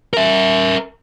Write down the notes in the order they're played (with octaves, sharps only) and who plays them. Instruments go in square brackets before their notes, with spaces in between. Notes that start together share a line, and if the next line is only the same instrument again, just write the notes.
[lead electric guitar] A#4 E5